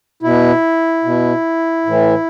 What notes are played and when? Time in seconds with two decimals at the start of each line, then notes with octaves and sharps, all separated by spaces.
0.23 B2 E4
1.04 B2
1.86 A2 E3